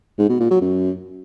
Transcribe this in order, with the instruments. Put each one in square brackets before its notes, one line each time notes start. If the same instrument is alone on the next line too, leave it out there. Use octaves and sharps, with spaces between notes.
[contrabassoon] G#2
B2
A#2
F#3
F#2